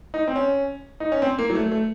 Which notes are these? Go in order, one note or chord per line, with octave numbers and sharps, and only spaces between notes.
D#4
C4
C#4
D#4
C#4
C4
A#3
F#3
A3
A3